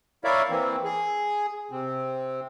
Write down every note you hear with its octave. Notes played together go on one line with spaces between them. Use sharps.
E4 A#4 C#5 D5 E5 F5
E3 A#3 C4
G#4
C3 C4